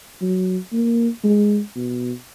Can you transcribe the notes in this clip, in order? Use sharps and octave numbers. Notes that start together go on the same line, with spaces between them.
F#3
A#3
G#3
B2